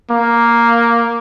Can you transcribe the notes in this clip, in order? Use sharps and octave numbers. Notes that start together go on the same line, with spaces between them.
A#3